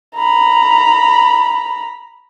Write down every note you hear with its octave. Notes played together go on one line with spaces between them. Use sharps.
A#5 B5